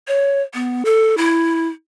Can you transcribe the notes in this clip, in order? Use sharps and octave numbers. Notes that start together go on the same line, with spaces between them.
C#5
B3
A4
E4